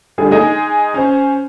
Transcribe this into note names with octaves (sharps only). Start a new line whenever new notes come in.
D3 G3 G#4
G#3 D#4 G#4
C#4 C5